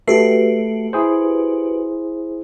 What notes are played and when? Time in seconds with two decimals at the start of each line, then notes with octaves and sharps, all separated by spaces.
0.08 A3 F#4 G4 A4 B4 C7
0.93 E4 G#4 C5